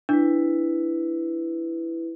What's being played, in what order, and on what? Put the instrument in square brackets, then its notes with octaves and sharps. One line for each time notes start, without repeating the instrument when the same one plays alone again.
[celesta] D4 [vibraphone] E4 B4